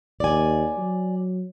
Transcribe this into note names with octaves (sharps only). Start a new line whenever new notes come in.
D#2 D5 G#5
F#3